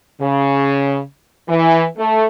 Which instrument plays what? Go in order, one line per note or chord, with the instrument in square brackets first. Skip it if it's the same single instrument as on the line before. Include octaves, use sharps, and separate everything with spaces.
[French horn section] C#3
E3
A3